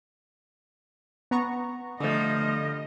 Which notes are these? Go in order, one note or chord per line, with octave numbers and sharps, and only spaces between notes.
B3 A#5 C#6
D3 F3 G3 A3 D#5